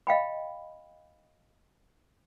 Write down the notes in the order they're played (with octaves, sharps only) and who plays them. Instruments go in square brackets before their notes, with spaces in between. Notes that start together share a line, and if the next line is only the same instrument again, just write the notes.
[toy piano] D#5 F5 G5 B5